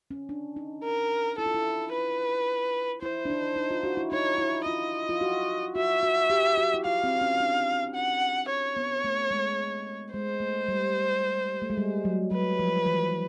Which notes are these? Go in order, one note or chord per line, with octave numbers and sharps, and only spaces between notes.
C#4
D4
D#4
A#4
E4 A4
F4
E4
B4
E4 C5
D4
D#4
D#4
F4
F#4
E4
D#4 C#5
E4
F4 D#5
F4
F#4
F#4 E5
F#4
G4
F#4
E4
F4 F5
C4
C#4
D4
F#5
C#5
B3
A3
G#3
G#3 C5
A3
G3
A3
G#3
G3
F#3
F#3 B4
F3
E3